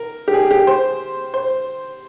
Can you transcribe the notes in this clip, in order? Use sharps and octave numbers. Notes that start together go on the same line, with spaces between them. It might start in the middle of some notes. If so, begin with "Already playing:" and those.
Already playing: A#4
G4
G#4
G4
C5
C5